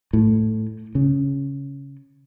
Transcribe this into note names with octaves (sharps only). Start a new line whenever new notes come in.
A2
C#3